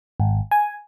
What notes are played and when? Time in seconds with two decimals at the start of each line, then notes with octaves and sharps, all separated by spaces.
0.20 G#1
0.51 G#5